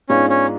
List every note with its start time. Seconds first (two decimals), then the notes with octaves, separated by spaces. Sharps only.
0.09 G#2 G#3 B3 C#4 D4 F4
0.30 C#4